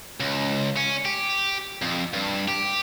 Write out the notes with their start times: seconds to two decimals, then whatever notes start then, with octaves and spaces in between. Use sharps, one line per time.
0.20 C#2
0.77 C#4
1.05 G4
1.82 F2
2.13 G2
2.48 G4